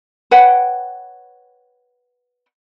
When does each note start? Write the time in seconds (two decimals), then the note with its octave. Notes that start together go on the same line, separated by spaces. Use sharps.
0.31 B4 C#5 F#5 G5